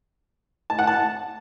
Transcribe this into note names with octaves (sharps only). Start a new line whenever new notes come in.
A5
F#5
A5